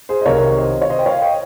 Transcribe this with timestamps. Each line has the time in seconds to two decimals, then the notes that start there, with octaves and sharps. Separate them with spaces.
0.09 G#4 C5
0.21 D#5
0.25 C2 C3 D#3 A#4 C#5
0.58 C5 D#5
0.82 C#5
0.90 C5 D#5
0.99 G5
1.06 C#5 F5
1.22 D#5 G5